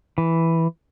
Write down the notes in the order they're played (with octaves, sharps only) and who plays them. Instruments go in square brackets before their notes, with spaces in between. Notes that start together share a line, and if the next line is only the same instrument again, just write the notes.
[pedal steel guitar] E3